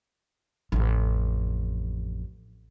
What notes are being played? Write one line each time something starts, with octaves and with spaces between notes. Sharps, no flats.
A1 F2